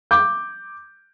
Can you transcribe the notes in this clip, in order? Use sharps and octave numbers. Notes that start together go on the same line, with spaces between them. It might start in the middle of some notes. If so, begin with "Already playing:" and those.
D6 G6